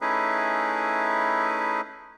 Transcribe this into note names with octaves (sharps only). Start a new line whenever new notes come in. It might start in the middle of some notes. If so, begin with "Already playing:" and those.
A3 C#4 D#4 E4 G#4 B4